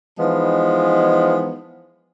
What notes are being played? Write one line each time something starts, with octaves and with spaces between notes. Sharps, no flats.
E3 F3 G#3 B3 D#4